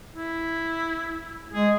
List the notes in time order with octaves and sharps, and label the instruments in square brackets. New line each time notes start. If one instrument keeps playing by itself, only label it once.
[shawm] E4
[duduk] G#3 [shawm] G#4